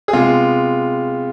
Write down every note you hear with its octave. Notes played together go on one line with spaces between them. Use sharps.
G#4
C3 G#3 B3 F4